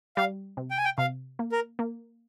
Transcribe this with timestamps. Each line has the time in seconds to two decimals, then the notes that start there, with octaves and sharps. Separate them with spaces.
0.17 G3 F5
0.57 C3
0.71 G5
0.78 G#5
0.85 G5
0.98 C3 F5
1.39 A#3
1.52 A#4
1.79 A#3